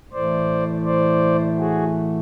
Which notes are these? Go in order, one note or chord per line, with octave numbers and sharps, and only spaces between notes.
A2 E3 A3 C5 D5
C5 D5
F#4 G#4